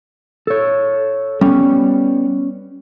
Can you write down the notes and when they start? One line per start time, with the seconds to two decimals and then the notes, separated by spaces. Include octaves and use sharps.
0.47 A4 C#5
1.41 G3 B3 C#4